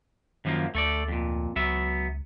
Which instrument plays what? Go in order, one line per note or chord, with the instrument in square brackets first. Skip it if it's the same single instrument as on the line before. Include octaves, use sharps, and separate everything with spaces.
[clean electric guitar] F#2 F3 A#3 [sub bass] D#3
[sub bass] D2 [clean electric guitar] A3 A4 D5
[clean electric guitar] F2 A#2
[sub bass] C#2 [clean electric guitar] F#3 B3 E5